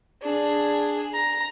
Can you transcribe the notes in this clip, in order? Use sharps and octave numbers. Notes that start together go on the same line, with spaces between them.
D4 G#4
A#5